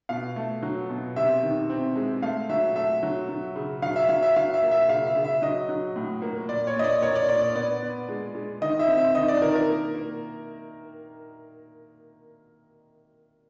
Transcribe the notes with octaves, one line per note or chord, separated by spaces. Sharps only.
B2 F5
A3
F#3
B2
C3 E5
D#3
C4
G#3
A3 F5
F#3 E5
A3 E5
F#3
F#3
C#3
F#3 F5
E5
F#3 F5
E5
F#3 F5
E5
A#3
E5
C#3 F5
E5
C#3
E5
F#3 D#5
F#3
A2
A#3
A#2 D5
C#5
A#2 D#5
D5
A#3 C#5
D5
A#2 D5
D5
B3 D5
B3
G#3
G#3
D#3 D#5
E5
C4
E5
D#3 D#5
D5
D#3 A#4
A#4
A#3
A#3